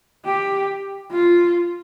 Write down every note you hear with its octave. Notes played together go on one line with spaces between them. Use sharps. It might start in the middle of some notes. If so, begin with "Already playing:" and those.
G4
F4